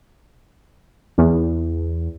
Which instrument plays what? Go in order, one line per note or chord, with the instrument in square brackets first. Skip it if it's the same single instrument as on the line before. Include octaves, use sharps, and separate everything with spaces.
[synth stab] E2